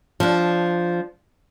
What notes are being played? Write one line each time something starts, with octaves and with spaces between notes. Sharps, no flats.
F3 D4